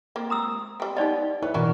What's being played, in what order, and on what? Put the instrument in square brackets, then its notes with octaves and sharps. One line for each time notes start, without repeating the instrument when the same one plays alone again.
[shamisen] F3 A#3 C4
[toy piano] A#5 D#6 E6
[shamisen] G3 C4
[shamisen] B3 G4 [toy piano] D#4 D5 D#5
[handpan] E4 [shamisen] B4 C#5
[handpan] B2 E3 A#4 [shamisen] C#4 D4 F#4